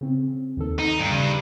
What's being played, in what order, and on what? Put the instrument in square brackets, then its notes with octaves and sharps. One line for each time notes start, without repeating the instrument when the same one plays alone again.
[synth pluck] C#3 C4
D#2 D#3 A4
[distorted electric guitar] D#4
[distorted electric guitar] G2 [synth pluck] D7
[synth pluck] C#3 A#5